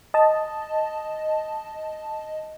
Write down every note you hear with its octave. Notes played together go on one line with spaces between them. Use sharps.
D#5 A5